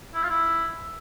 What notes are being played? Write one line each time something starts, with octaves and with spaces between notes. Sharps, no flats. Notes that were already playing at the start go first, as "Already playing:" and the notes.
E4
F4
E4